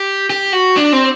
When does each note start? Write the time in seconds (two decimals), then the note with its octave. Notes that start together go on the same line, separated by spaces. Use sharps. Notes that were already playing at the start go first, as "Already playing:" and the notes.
Already playing: G4
0.30 G4
0.53 F#4
0.77 D4
0.93 C4